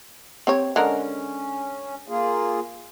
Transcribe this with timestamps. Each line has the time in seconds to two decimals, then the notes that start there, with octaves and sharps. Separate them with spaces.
0.47 C4 G4 C#5
0.76 D3 G#3 C#4 A#4
2.08 A#3 F4 G#4